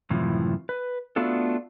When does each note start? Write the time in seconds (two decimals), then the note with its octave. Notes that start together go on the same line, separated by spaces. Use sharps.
0.10 F#2 A2 C3 E3 F3
0.69 B4
1.16 A3 B3 D4 F4 F#4 A4